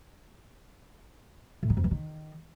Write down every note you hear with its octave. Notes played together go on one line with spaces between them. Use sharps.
A2
D#3
F2
E3
D#3